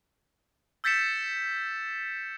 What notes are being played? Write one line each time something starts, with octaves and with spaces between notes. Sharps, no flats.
E6 G6 A6 B6 C#7 E7